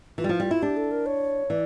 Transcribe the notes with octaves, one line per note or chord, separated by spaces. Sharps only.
E3 F4
G3
F3
G3
E4
D4 G4
A4
A#4
C#5
E3 D5